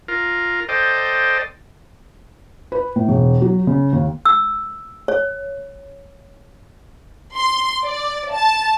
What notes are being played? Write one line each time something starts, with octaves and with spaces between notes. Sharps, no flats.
F4 A#4
A4 C5 D5 D#5 G5
B4
A2
E1
F#3
C#3
D#2
E6
C#5
C6
D5
A5